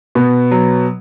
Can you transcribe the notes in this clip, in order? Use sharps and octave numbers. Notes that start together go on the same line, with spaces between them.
B2 B3
F#3